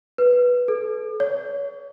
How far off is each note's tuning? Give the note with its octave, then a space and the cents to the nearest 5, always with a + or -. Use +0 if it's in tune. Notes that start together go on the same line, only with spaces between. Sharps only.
B4 -5
A4 -35
C#5 +35